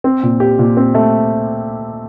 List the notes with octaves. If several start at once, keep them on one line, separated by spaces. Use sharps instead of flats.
C4
A#2
G4
A#2
C4
A3